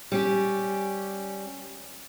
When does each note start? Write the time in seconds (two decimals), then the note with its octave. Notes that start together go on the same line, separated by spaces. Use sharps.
0.12 G3 C#4 G4